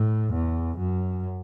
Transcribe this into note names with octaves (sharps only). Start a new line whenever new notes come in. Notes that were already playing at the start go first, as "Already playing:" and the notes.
Already playing: A2
E2
F#2